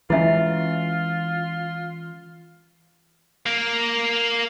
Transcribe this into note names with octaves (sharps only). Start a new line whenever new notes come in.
E3 G#3 C#4 E4 F4 E5
A#3